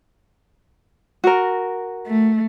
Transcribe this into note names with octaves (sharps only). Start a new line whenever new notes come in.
F#4 A#4
A3